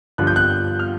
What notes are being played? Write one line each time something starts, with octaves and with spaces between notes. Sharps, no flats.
G2 D3 F3 F#6
G6
F#6
F6